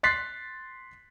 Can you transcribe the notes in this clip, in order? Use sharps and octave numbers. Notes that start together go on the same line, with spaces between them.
C6 F#6 A6 B6 C7